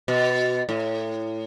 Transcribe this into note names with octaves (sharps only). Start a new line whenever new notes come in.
B2
A2